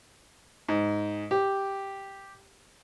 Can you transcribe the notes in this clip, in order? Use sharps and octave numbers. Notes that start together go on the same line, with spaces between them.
G#2
G4